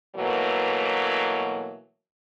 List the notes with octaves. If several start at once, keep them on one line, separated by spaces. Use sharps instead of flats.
B2 E3 F#3 A3 A#3